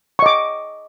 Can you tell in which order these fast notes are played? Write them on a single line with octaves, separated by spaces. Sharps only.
C#6 D#5 D6